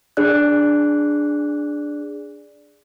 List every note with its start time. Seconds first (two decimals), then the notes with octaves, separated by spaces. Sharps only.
0.17 D4 G#4 D5 F#6